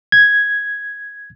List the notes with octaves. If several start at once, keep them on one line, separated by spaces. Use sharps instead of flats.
G#6